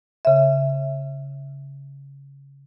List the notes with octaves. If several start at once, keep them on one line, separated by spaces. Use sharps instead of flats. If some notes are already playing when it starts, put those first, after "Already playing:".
C#3 E5